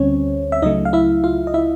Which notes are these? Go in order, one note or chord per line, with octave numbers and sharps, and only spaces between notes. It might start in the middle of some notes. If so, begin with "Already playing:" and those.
Already playing: D2 D3 G3 C4 C#4 C#5
E5
C#2 C#3 F#3 A3 D#4 D#5
F5
E4 E5
F4 F5
D#5
E4 E5